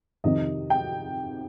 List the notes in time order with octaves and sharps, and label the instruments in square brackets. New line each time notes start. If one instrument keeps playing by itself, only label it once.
[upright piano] F2 C3 D#3 D#5
G5